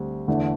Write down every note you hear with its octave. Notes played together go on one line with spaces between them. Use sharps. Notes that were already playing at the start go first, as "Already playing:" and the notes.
Already playing: D2 G3 C4
E2 D3 A3